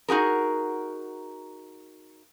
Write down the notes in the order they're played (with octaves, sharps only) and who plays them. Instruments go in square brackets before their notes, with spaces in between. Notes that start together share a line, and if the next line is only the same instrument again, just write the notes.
[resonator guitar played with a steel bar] D#4 F#4 G#4 A#4